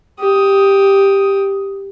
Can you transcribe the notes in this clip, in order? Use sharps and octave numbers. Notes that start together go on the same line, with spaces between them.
G4 D#6